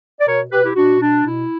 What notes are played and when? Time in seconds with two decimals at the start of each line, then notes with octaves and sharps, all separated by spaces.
0.20 D5
0.27 B2 A#4 C#5
0.51 B2 G4 B4
0.63 E4 G4
0.75 B2 D4 F#4
1.00 B2 D4
1.24 B2 E4